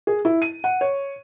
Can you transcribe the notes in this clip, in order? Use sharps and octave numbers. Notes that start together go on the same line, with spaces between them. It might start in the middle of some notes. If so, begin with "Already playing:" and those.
G#4
E4
D#7
F#5
C#5